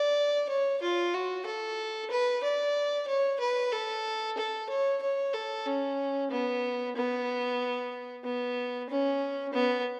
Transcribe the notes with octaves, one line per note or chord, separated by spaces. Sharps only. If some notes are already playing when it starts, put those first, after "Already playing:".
Already playing: D5
C#5
F4
F#4
A4
B4
D5
C#5
B4
A4
A4
C#5
C#5
A4
C#4
B3
B3
B3
C#4
B3